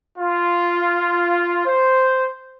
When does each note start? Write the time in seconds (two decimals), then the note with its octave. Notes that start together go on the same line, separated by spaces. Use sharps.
0.18 F4
1.65 C5